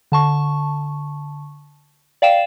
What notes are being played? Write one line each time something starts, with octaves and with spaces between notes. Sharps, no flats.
D3 A5 C#6
D5 F5 G5 E7